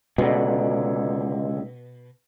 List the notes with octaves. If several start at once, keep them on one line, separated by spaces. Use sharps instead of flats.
C#2 B2 D3